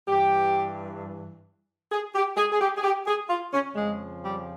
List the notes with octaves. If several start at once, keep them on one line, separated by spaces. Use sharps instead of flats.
G2 E3 G4
G#4
G4
G#4
G#4
G4
G#4
G4
G#4
F4
C#4
F2 C#3 F3 G#3
G3